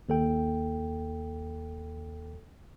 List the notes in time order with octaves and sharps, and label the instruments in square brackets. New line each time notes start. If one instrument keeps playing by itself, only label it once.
[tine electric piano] D#2 A4 G5